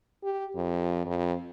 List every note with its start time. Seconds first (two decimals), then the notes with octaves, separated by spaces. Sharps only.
0.24 G4
0.56 F2
1.06 F2